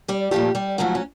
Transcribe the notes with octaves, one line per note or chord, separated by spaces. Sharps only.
G3 G4
A#2 F3 G3 A3 G4
G3 G4
G#2 F3 F#3 A3 F#4
C#4